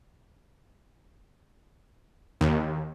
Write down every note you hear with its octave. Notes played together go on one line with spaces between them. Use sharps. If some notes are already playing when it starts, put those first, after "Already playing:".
D#2